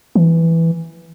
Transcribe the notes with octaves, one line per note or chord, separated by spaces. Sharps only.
E3